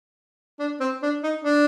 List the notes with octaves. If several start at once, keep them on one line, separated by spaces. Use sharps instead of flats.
D4
C4
D4
D#4
D4